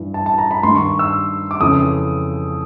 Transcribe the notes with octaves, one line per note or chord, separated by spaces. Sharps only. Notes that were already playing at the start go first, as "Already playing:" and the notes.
Already playing: G2 E3
A5
A5
A#5
B5
G2 D#3 C6
C#6
E6
D6
F2 C#3 E3 D#6